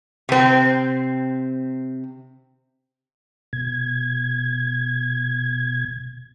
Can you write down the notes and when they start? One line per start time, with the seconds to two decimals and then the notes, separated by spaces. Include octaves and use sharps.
0.29 C3 C4
3.53 B2 G#6